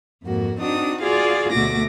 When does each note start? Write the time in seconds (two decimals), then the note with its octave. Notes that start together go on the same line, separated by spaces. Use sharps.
0.23 F2 G#2 A#3 F#4
0.59 C4 D4 D#4 F#4 D#6
1.02 F4 F#4 G#4 D5 F5
1.51 D2 B2 A3 F#4 D6 A#6